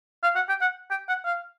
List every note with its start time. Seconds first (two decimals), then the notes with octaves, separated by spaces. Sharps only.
0.23 F5
0.35 F#5
0.49 G5
0.61 F#5
0.90 G5
1.09 F#5
1.25 F5